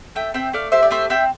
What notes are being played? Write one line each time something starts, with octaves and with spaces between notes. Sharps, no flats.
A3 E5 G5
C4 E5 G5
A3 D5 F5
G4 C5 E5
D5
A3 C5 E5
C4 E5 G5